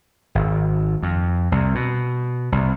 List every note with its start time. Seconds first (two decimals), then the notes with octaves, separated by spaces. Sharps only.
0.35 G#1
1.02 F2
1.52 C2
1.75 B2
2.52 C2